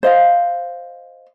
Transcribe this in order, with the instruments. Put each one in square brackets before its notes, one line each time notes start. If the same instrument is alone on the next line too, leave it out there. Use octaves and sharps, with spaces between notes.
[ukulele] C5 D#5 F5